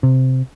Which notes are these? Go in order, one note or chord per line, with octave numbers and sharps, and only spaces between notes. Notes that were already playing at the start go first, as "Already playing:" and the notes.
C3